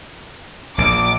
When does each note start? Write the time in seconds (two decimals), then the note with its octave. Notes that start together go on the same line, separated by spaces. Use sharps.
0.78 A#1 D6